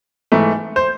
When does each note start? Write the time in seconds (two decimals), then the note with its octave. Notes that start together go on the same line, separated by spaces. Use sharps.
0.32 G#2 E3 A3
0.76 C5